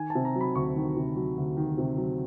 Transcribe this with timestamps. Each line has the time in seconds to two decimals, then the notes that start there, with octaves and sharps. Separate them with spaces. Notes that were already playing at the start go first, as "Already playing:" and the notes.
Already playing: D#3 G#5
0.10 A5
0.15 C3
0.25 A#5
0.36 F#3
0.41 B5
0.55 D2 C#6
0.76 D#3
0.97 C3
1.16 F#3
1.37 D2
1.57 D#3
1.78 C3
1.97 F#3